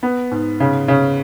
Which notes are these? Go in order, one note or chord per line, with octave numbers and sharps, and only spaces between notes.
B3
G#2
C#3
C#3